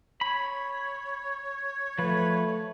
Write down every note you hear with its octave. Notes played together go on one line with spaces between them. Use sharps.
C#5 B5
F3 A3 B4